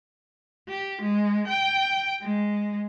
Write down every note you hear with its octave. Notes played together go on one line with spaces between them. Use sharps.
G4
G#3
G5
G#3